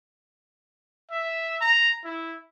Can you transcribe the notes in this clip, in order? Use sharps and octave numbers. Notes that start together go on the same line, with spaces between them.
E5
A#5
E4